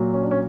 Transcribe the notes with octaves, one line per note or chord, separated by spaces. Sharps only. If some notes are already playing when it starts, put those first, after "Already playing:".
Already playing: A#2 F#3
C#4
D4
C#4